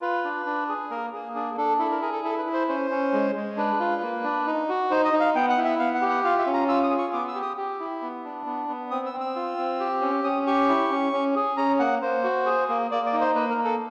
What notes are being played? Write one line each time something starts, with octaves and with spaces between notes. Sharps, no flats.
F4 B4
D4
D4
G#4
A#3 A#4
A#3 G#4
D4 G#4
D4 A4
E4 A4
A#4
G#4 A#4
A4
E4 A4
B4
E4
C5
C#4 C5
C#4
G#3
G#3
D4 B4
F4
A#3
D4
D#4
F#4
D#4 C5
D#5
D#4
F5
B3 G5
F#5
E4
E5
B3 F5
F#5
G4
F#5
F4 F5
E5
C#4
A#5
F4 E6
D#6
G#4
C#6
B3 D6
E6
G4
D#6
G4
E4
B3
D4
B3
B3
C4 D#6
E6
C4
E6
F4
C4
G4
C#4
C#4 D#6
G4 C#6
E4
C#4
C#4
G#4
C#4 A#5
A#3 F#5
A#3 C5
F#4
G#4
A#3
A#3 D5
D5
D#4
C5
A#3 B4
A#4
A#3
A4